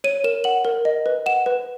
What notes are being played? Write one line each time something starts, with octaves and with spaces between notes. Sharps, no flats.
C#5 D#7
A#4 E7
F#5 F#7
A#4
D#5
B4
F#5 E7
B4